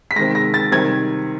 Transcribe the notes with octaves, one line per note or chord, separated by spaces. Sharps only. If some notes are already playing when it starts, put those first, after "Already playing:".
B6
C3 D#3 G#3 A#6
A#6
A6
C3 D#3 G3 G#6